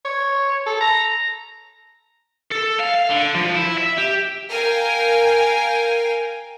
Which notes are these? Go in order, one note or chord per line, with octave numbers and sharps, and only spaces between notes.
C#5
A4
A#5
A4
F5
F5
D3
F3
E4
E5
G4
A#4 F5 G5 G#5